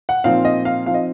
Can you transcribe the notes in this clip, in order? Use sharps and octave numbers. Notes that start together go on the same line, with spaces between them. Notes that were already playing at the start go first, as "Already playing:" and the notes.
F#5
A#2 F3 C4 D#4 F5
D#5
F5
F3 C4 D#4 F5
D#5